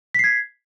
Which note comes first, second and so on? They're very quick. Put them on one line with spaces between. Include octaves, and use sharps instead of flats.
B6 C7 G#6